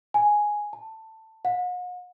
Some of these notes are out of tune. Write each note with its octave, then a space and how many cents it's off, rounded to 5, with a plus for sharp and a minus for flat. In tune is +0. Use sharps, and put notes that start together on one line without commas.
G#5 +5
A5 +15
F#5 -45